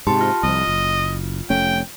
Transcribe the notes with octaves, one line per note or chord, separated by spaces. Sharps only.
G#2 C3 G4 A5 C6
F4 F6
C2 F3 D#5
F#1
F1 A3 C#4 G5